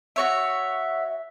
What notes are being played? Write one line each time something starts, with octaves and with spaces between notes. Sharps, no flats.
F#4 C#5 E5